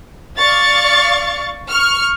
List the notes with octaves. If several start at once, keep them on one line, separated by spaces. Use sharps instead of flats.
D5 F5 C#6 A6
C#6 F6